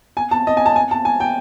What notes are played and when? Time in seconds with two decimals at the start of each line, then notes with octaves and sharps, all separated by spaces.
0.17 G#5
0.31 A5
0.47 D#5
0.57 G#5
0.66 A5
0.76 G#5
0.91 A5
1.05 G#5
1.20 G5